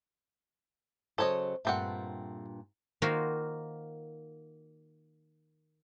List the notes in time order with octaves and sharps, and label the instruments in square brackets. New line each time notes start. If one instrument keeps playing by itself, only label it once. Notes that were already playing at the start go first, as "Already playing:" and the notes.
[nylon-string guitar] C#3 F#3 C5 [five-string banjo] A4 C#5 D#5
[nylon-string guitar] G2 A#2 [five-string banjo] A3 C4 F#5
[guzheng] D#3 A#3 F4 F#4 A#4 C5